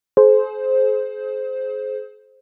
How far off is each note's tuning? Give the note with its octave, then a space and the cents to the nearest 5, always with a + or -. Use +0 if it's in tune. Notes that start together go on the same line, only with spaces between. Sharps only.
G#4 +40 C5 +0